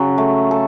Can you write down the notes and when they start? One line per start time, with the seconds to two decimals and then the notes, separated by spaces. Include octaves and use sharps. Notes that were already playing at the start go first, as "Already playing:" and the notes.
Already playing: C#3 F#3
0.18 A3
0.51 A4